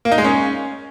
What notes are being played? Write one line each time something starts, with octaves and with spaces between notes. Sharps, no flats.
A#3
D#4
G#3
C#4